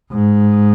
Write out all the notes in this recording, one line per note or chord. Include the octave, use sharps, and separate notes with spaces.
G#2